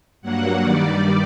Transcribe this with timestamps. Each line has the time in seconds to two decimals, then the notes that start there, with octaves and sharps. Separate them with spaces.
0.22 G2 F#3 A#3 F#5
0.62 G2 D#3 G3 D5